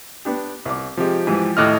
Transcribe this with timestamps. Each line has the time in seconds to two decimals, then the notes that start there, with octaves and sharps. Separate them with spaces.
0.25 B3 D4 G4
0.65 C2 D6
0.97 C3 F3 G#3 G4
1.27 G#2 E3
1.57 D#2 A2 D#5 D6 F6 F#6